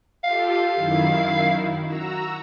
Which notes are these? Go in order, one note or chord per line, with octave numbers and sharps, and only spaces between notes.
F4 G4 A4 F5
F#2 D#3 E4
F#4 A#5 E6